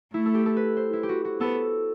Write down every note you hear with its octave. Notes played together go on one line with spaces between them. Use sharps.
A3 E4
A4
G4
A4
B4
C5
E4
G4
F#4
F#4
B3 A4